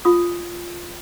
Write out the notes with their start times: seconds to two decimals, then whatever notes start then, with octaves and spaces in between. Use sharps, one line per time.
0.05 F4 D#6